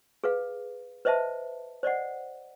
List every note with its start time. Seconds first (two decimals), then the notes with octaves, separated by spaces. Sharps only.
0.24 G#4 B4 F5
1.05 B4 C5 D#5 E5 A5
1.83 C5 D5 D#5 F#5